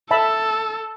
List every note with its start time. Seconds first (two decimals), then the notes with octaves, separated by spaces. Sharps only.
0.11 A4 E5 A5 B5